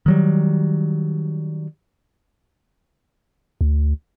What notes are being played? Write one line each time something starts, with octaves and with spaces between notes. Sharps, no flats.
D#3 F#3 G3
D2